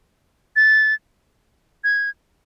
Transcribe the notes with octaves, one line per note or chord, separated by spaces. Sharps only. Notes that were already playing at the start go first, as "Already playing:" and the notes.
A6
G#6